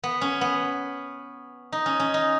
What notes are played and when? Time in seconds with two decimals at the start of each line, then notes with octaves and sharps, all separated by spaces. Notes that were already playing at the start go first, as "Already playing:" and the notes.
0.04 B3
0.21 C#4
0.41 B3
1.72 D#4
1.86 C#4
2.00 C#4
2.14 D#4